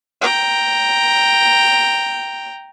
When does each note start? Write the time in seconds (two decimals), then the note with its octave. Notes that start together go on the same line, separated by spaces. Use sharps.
0.21 G5 A#5